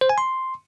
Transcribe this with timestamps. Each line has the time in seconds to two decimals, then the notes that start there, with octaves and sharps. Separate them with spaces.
0.01 C5
0.09 G#5
0.18 C6